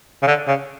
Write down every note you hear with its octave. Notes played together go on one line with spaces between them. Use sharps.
C#3
D3
C#3